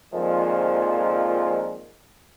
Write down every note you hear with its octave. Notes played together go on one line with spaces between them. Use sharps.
F2 A#2 D#3 F3 G#3